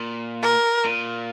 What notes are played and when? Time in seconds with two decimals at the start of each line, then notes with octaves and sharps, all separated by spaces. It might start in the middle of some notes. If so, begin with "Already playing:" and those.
Already playing: A#2
0.43 A#4
0.85 A#2